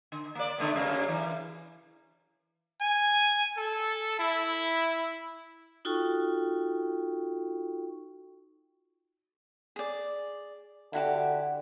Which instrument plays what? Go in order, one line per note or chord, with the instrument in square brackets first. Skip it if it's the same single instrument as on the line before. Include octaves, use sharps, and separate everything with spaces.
[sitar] D3
A#3 D5
D3 A3 B3
F#2 C#3 A#3
E3
[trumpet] G#5
A4
E4
[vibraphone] D#4 F4 F#4 A4 G5 C#6
[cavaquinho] G#4 D5
[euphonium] D3 [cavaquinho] E4 F#4 G4